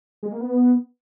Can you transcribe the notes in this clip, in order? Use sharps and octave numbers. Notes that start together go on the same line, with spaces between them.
G#3
A#3
B3